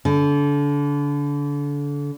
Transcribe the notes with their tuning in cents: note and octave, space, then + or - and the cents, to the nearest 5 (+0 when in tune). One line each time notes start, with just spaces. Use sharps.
D3 -30